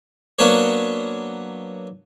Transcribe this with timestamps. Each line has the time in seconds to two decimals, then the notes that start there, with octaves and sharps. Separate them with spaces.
0.39 F#3 A#3 B3 D4 C5 C#5